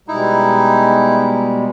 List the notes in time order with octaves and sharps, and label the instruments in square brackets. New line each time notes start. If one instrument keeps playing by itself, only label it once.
[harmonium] B2 G3 G#3 [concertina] D#4 E4